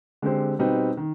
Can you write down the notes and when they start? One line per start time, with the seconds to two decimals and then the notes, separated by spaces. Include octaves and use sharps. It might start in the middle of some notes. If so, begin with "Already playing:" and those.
0.22 D3 G#3 C4 G4 C5
0.59 B2 G3 C4 D#4 B4
0.97 D#3